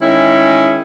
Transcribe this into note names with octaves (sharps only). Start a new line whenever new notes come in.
D#3 G#3 C#4 E4